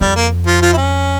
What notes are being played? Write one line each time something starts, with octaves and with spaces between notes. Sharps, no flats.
F2 G3
A#3
F3 F4
F3 F4
E4
C#4